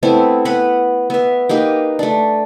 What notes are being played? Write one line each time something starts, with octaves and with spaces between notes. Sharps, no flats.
A3 B3 C4 E4
B3 B4 F#5 B5
B3 E5
A#3 D#4 G4 B4
A3 D4